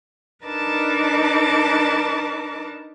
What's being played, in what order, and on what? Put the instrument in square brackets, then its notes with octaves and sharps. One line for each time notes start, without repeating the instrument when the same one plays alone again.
[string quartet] D4 D#4 A#4 B4 A5 D6